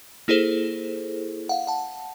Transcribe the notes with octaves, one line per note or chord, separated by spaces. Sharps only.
A#3 E4 G#4 A4 C5
F5 F#5
F#5 A5